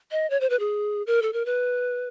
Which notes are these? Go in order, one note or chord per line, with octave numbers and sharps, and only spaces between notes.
D#5
C#5
C5
B4
G#4
A#4
A4
A#4
B4